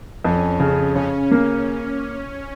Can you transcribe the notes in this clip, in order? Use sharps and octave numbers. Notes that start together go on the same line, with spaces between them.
F2 C#4
C#3
C#3 C#4
A#3